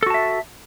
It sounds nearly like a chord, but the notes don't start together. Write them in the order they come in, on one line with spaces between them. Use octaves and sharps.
A4 F#4 A5 E5